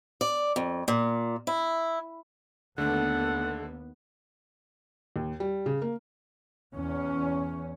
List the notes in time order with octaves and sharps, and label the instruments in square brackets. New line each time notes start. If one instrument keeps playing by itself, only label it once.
[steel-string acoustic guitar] D5
F2
A#2
E4
[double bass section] D#2 B3 [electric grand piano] D3 A3 D4 [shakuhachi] A4 [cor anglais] F#5
[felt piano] D#2
G3
C#3
A#3
[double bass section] E2 C#4